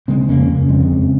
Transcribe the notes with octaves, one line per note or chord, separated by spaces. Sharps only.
C#3 G#3 C4
F2 A#3 C#4
C#3
F2 G#3 C4
C#3